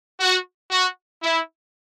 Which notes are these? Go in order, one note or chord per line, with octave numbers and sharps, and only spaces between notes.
F#4
F#4
E4